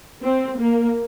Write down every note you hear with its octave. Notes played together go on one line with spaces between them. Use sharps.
C4
A#3